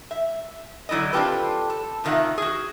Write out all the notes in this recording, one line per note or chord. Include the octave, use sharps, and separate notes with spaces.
E5
D3 F#3 E4 D5 D#5
C4 D4 F4 G4 A4 B4
A4
A2 C3 D#3 F4 E5 F#5
F#4 G#4